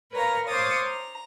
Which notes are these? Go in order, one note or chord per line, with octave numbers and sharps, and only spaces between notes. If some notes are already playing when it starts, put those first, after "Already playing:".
A#4 B4 C#5 F5 A#5
C5 C#5 F5 D6 D#6 A6
A#5